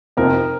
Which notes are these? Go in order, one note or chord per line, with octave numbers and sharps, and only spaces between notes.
F2 C3 F3 A#3 D#4 A#4